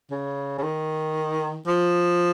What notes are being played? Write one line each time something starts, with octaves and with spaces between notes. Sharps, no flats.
C#3
C#3
D#3
F3